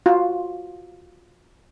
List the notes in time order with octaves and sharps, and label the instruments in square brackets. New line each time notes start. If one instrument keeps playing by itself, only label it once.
[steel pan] F4 F#4